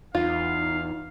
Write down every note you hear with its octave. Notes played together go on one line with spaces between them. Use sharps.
E2 D#4 F4 F5